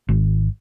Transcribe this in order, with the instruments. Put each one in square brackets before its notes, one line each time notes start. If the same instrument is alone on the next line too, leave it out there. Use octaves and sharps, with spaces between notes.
[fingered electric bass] G#1